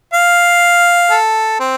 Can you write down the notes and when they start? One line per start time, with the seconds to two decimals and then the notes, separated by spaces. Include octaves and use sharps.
0.14 F5
1.11 A4
1.60 C4